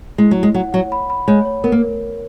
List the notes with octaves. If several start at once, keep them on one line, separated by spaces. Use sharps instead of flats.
G#3 E4
F#3
E4
G#3
F#3 F#5
F#3 F#5
B5
B5
G#3 C#5
C#5
B3 A#4
A#3